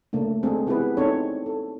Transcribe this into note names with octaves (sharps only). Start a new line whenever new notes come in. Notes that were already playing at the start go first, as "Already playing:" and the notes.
C#3 A3 A#3 D4
G#3 C4 D4 G#4 A4
B3 C4 E4 G4 G#4 B4
C4 D4 D#4 A4 C5 C#5
A4